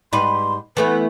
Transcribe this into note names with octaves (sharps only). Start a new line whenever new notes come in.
G#2 G3 B4 C6
E3 A3 B3 B4